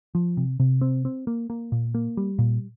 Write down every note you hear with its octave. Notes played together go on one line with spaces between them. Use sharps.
F3
C3
C3
C4
C4
A#3
A#3
A#2
A#3
G3
A#2